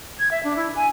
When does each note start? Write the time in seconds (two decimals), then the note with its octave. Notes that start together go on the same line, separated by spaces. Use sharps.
0.19 G#6
0.31 E5
0.43 D4
0.56 E4
0.75 G#5